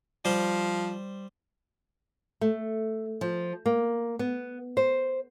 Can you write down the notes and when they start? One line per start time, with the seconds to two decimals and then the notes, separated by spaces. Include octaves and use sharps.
0.25 F3 G3 C5
2.41 A3
3.21 F3
3.66 A#3
4.19 B3
4.77 C5